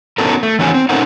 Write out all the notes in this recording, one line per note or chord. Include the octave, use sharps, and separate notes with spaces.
B3 C#4 D#4 F#4 A4 A#4
A3
E2 D#3 C#4 F#4 G#5
C4
C#4 D#4 A4 A#4 C5 F#5